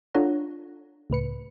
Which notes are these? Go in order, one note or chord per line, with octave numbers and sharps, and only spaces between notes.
D4 F4 A4 C#5 F#5 A#5
C#2 A2 B4 C#7